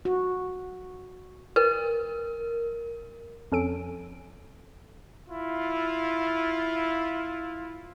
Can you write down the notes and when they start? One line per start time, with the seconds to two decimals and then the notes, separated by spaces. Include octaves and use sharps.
0.05 F#4
1.56 A#4 B4
3.52 F2 C#4 A4 D7
5.28 E4 F4